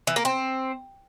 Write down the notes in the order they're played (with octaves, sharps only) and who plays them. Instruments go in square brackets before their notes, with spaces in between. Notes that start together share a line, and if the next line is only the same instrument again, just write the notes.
[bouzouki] E3
A#3
C4